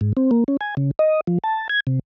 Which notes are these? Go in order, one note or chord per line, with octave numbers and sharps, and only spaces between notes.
G#2
C4
A#3
C#4
G#5
C#3
D#5
F3
A5
G#6
C3